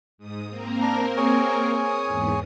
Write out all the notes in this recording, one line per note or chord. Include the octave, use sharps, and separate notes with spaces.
G#2 D#6
A#3 C4 A#4
D4 A#5
G#4 C#5 G#5
D#6
E2 G#2